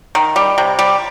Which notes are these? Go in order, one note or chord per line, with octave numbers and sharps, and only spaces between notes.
D#3
G3
C3
G3